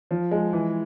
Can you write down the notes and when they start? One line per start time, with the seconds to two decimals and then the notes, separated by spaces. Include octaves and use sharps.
0.11 F3
0.31 G#3
0.53 E3